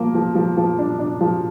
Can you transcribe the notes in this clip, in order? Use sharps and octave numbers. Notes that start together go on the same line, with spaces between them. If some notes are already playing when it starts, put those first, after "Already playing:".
Already playing: F3 A#3
F3
F3
F3
D4
D4
F3